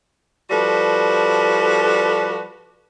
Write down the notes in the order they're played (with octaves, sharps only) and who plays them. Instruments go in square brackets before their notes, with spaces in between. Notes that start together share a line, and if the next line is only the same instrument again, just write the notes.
[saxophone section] F3 G3 F#4 A4 B4